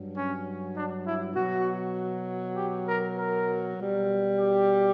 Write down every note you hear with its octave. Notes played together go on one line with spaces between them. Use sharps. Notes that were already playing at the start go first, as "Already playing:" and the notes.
Already playing: G2 F#3
C#4
D4
E4
B2 F#3 F#4
G4
A#4
A#4
B2 G3
G4